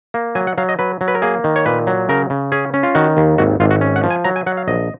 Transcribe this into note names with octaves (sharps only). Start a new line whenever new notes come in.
A#3
F#3 G#5
F#5
F#3 F5
D#5
F#3 B4
F#3
B4
A#4
A#3 G#4
D#3
C#5
A#2 B4
F#3
C#3 A#4
C#3
C#4 G#4
C#4
F4
D#3 F#4
D#2
G#1 F#4
G#1 F4
F#4
C#4
F#5
F3
G#5
F#3 A#5
G#5
F#3 F#5
F5
A#1 D#5